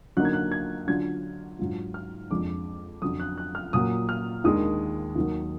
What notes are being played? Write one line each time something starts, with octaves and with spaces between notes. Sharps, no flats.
D3 F#3 A#3 D#4 F#6
G#6
F#6
G#6
D3 F#3 D4 F4 G#6
G#2 F#3 D4 F4
F6
F2 F3 G#3 D4 D6
F2 D3 F#3 D#6
F#6
F#6
F6
A#2 F#3 A#3 D#6
F6
D#2 D#3 G#3 D4 D#6
D#2 D#3 F#3